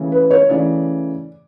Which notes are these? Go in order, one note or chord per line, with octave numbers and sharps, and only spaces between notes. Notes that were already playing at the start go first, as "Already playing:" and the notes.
Already playing: C#3 E3 A3
B4
C#5
C#3 E3 A3 D5